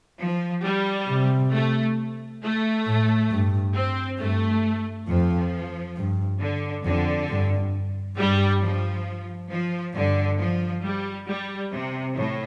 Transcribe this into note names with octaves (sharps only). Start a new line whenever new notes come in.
F3
G3
C3
A3
A3
A2
G2
C4
G2 A3
F2 F3
G2
D3
F2 D3
G2
G2 G3
F3
F3
G2 D3
F3
G3
G3
C3
A2